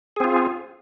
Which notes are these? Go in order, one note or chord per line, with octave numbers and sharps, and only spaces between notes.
C4 F4 G#4